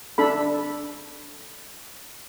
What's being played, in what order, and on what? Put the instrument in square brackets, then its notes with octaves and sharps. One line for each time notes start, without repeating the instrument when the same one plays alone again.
[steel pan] D4 A4 B5